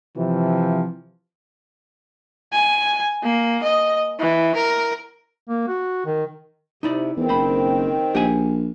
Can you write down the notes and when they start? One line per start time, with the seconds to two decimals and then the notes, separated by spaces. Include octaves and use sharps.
0.17 C3 E3 F3
2.53 G#5
3.23 A#3
3.63 D#5
4.19 E3
4.55 A#4
5.49 A#3
5.68 F#4
6.06 D#3
6.83 C3 D#4 E4 D5
7.16 E2 D#3 C4
7.29 F#1 C5 B5
8.15 A#1 G4 F#5 G#5